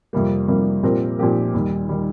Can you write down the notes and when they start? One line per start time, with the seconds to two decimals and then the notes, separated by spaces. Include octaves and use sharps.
0.13 F2 C3 G3 A#3
0.48 F2 C3 G3 A#3
0.83 A#2 F3 C4 G4 A#4
1.19 A#2 F3 C4 G4 A#4
1.54 D#2 D#3 G3
1.89 D#3 G3